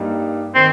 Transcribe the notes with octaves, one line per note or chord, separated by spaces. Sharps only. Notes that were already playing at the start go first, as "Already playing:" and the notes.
Already playing: G2 G3 A#3 D#4
D#3 C4